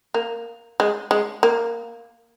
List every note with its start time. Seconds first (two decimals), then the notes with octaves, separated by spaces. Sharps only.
0.14 A#3
0.80 G#3
1.11 G#3
1.43 A#3